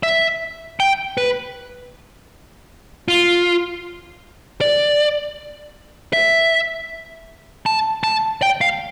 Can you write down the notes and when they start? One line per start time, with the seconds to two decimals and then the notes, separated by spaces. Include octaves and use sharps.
0.03 E5
0.80 G5
1.17 B4
3.08 F4
4.61 D5
6.13 E5
7.66 A5
8.04 A5
8.42 G5
8.61 F5